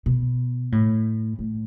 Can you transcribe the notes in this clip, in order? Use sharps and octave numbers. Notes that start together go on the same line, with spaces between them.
B2
A2
A2